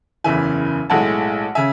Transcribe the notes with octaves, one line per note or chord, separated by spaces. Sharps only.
F#1 E2 C#3 E3 E5 G#5
B1 A2 G#3 F#5 A5
C#3 E5 G#5